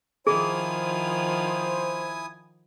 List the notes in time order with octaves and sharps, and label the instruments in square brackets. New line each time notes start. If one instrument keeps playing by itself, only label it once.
[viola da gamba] D#3 F3 [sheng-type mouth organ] E4 G#5 D#6 [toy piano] G#4 [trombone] C5